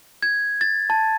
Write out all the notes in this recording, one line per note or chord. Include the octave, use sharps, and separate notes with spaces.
G#6
A6
A5